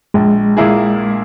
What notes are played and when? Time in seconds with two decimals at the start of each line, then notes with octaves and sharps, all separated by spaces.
0.14 A#1 G#3
0.57 A#2 A#3 E4 G#4